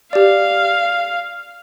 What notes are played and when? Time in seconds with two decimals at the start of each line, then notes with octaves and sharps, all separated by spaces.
0.13 G4 D5 F5